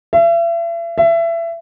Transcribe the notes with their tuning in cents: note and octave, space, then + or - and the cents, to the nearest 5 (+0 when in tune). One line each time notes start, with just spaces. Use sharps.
E5 +40
E5 +25